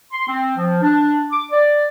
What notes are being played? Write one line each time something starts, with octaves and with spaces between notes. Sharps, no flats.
C6
C4
F3
D4
D6
D5